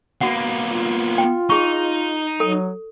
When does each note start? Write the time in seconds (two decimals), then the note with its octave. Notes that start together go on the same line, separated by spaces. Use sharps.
0.21 A#3 B3 F#4 F#5
0.66 F4
1.18 G5
1.50 D#4 G#4 C#6
2.40 F#3 A4